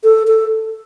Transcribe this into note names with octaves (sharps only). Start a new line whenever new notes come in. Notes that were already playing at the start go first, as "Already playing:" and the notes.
A4
A4